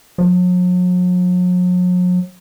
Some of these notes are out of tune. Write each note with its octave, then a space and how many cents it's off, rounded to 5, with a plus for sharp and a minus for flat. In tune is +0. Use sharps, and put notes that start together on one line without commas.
F#3 -45